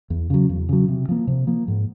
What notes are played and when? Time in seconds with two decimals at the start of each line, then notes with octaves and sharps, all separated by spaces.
0.10 E2
0.30 C#3 F#3
0.49 E2
0.69 C#3 F#3
0.88 C3
1.09 F3 A#3
1.27 C3
1.47 F3 A#3
1.68 G#2